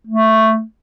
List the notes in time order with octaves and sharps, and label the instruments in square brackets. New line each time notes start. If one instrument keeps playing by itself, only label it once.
[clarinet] A3